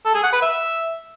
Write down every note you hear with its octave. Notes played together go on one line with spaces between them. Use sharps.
A4
G#4
F#5
B4
E5